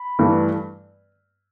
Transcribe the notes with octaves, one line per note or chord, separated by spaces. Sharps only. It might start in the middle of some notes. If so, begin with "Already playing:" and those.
Already playing: B5
G2 E3 A3